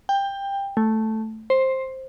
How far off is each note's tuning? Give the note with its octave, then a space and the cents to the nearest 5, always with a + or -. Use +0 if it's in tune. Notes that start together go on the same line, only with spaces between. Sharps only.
G5 +15
A3 +0
C5 +10